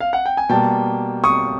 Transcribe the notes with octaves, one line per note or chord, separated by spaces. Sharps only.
F5
F#5
G5
G#5
B2 G3 A#3 G5 A5
C#6 D#6